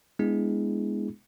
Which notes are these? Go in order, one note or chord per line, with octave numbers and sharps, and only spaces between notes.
G#3 B3 D4 E4 G#4